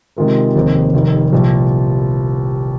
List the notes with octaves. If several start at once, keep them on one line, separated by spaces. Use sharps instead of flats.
C3 D#3 G#3 F4 A#4
F1 D#2 D#3 C4 G#4
F1 D#2 D#3
C2 A#2 F3